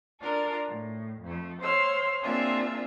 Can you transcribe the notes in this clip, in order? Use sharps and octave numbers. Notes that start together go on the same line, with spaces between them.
D4 F4 A4 A#4
A2
F2 A3
C5 C#5 F5 C6 E6
A#3 C4 D4 F4 G#4 E5